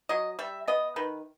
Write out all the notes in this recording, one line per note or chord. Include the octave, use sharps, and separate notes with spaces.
F#3 D#5
G3 E5
B3 D#5
D#3 B4